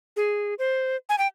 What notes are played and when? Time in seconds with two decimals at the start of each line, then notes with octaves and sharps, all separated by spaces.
0.16 G#4
0.59 C5
1.09 G#5
1.18 G5